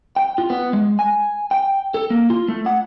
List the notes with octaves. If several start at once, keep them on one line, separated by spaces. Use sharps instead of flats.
G5
F4
B3
G#3
G#5
G5
A4
A#3
F4
A3
F#5